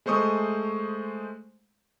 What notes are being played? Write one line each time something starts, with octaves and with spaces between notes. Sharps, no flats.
G#3 A3 C5 C#6 D#6